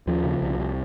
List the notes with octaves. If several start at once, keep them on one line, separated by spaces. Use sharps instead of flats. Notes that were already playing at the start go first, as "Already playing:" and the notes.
D#2 F3
C#3
C2
C3